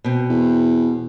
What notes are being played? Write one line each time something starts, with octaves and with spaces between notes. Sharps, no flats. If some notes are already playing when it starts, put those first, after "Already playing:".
B2 C4
E2